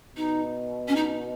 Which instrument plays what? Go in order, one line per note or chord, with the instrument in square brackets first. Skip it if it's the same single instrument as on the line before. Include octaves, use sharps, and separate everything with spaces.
[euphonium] B2 [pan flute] D#4
[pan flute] C#4
D#4